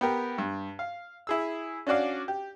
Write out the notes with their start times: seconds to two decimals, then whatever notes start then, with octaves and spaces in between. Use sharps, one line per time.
0.01 B3 G4 A#4
0.38 G2
0.79 F5
1.27 E4 G#4 E6
1.87 C#4 D4 F#4 D5 F5
2.28 G4